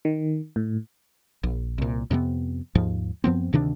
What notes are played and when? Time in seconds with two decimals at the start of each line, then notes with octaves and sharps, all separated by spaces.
0.05 D#3
0.56 A2
1.43 A#1
1.78 C2 A#2
2.11 F2 C3 G3 B3
2.75 D#2 G#2 F3
3.24 F#2 F3 B3 C4
3.53 D2 C3 D#3 D4